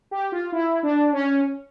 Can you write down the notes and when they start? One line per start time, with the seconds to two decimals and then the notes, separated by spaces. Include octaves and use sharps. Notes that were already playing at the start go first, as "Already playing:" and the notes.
0.11 G4
0.32 F4
0.52 E4
0.83 D4
1.13 C#4